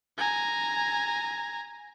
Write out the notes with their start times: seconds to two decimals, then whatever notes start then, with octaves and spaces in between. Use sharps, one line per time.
0.17 G#5 A#5